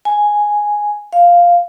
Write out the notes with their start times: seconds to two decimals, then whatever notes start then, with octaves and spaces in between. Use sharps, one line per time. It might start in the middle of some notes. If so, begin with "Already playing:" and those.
0.05 G#5
1.13 F5